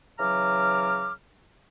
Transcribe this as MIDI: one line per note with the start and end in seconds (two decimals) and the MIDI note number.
0.19 1.12 49
0.19 1.12 52
0.19 1.12 54
0.19 1.12 82
0.19 1.12 86
0.19 1.12 89